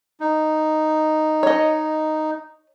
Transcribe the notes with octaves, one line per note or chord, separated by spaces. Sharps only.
D#4
C#5 D#5